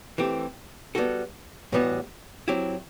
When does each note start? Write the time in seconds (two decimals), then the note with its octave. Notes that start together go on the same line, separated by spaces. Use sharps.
0.18 E3 A3 C4 G4
0.95 G3 B3 D4 F#4 A4
1.72 A2 E3 G3 B3 F#4
2.48 F#3 C4 E4 G4